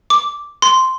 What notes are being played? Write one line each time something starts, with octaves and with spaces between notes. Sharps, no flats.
D6
C6